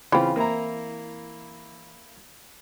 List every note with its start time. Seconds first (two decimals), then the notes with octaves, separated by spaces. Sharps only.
0.12 C#3 E3 C4 F4 B5
0.36 A#3 E4 A#5